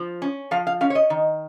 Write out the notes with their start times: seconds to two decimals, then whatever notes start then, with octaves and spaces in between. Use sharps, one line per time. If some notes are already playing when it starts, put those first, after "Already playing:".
Already playing: F3
0.22 C#4
0.51 F3 F5
0.67 F5
0.81 C#4 F5
0.90 C#5
0.95 D#5
1.10 D#3